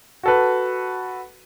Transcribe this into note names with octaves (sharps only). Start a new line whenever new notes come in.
F#4 A4 B4